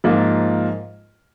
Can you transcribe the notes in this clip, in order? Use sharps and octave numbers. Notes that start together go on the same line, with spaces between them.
G#2 F3 A#3 F4